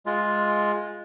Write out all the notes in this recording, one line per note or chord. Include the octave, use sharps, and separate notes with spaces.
G#3 F4